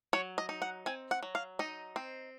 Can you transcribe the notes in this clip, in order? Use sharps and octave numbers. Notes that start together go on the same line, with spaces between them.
F#3 C#5
D#5
D#4
F#5
C4 G#5
F#5
F#3
F5
D#4 D#5
C4